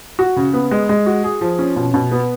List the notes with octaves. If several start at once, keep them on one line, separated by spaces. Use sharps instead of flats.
F#4
C#3
B3
G#3
G#3
F#4
G#4
F3
C#4
B2
B2
B3